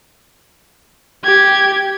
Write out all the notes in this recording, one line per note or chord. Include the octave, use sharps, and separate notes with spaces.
G4 G#6